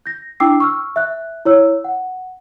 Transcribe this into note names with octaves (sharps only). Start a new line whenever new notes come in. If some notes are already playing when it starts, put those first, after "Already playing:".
G6 A#6
D4 E4 G5 D6 E6 C7
C#6 E6 F6
E5 F#6
E4 C#5 E6
F#5